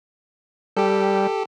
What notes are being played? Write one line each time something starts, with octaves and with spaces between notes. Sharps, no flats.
G3 G4 A4